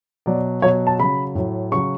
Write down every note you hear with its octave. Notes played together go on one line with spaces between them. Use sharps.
B2 F#3 D5
B2 F#3 C#5
A5
C#3 F#3 B5
A2 F#3
C#3 F#3 C#6